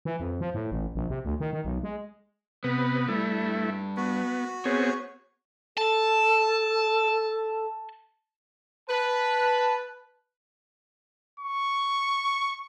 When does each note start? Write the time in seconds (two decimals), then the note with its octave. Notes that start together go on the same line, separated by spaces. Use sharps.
0.05 E3
0.20 F2
0.41 F3
0.54 A2
0.72 A1
0.95 A#1
1.10 C3
1.25 D2
1.40 D#3
1.53 D#3
1.65 B1
1.83 G#3
2.64 C3 B3 B4
3.08 G2 G3 A3 E4
3.97 B3 F#4
4.65 B3 C4 G#4 C#5
5.77 A4 A5
8.89 B4 A5
11.40 C#6